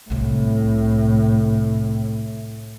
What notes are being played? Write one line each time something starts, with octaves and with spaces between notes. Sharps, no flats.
C2 A2 C3